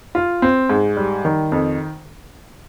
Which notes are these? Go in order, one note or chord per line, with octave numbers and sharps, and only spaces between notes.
F4
C4
G#2
G3
D#3
F2